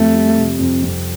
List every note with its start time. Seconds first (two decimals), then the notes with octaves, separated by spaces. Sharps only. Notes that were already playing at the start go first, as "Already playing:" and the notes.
Already playing: F2 G3 A3
0.15 G3
0.38 C3
0.59 F2
0.82 F2